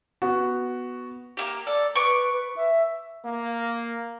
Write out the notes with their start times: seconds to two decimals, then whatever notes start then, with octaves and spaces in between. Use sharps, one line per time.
0.22 B3 F#4
1.37 A#3 E4 G4
1.67 A4 D5
1.95 B4 C#6 D6
2.33 B4
2.56 E5
3.25 A#3